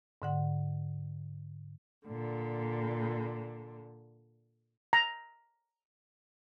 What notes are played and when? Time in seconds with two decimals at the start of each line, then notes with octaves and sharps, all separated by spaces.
0.22 G#2 D3 F#5
2.06 A#2 D3
4.93 A#5